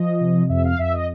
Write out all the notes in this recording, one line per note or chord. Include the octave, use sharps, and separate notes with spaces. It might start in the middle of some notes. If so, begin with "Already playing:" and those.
Already playing: F3 D#5
C3
F2 E5
F5
F2 E5
D#5